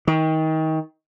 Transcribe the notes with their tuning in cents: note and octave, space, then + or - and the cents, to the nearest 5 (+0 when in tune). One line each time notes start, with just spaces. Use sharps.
D#3 +30